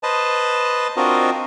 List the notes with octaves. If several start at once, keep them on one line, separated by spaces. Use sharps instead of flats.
B4 C5 D#5 A5
C4 D4 F4 F#4 A#4 D#5